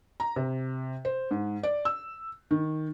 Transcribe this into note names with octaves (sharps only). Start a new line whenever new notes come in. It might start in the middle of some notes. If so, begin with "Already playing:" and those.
A#5
C3
C5
G#2
D5
E6
D#3